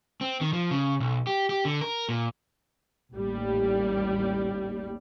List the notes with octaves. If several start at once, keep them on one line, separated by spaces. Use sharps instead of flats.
C4
D#3
F3
C#3
B1
G4
G4
D3
A#4
A#2
A1 D#2 G3